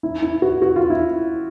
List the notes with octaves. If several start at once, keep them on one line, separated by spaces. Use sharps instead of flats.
E4
E4
F#4
F#4
F4
E4